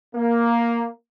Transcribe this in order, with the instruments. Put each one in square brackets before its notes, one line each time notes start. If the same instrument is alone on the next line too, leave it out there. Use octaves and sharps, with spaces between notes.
[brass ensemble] A#3